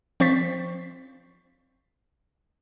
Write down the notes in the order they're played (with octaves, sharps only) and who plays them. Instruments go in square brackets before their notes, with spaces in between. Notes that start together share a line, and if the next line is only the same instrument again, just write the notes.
[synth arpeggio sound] F3 C4 C5 C#6 A6 B6